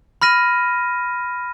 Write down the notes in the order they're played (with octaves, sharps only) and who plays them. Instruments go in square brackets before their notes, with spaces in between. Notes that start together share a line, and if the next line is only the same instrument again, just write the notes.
[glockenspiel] B5 F6 A#6 D#7